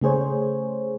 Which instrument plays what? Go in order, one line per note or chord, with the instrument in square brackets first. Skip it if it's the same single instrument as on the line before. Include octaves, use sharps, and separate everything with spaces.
[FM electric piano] C#3 A3 G#4 C5 C#5